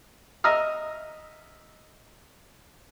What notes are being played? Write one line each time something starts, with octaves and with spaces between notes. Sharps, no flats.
D#5 E5 A#5 D#6 F6